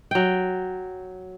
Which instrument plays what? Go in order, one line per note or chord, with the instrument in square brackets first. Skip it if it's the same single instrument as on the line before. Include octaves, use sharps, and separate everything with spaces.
[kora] F#3 G5